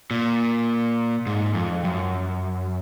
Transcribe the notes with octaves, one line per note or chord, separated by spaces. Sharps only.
A#2
G#2
F2
F#2